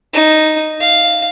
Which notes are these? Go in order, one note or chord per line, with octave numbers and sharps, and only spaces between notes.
D#4
F5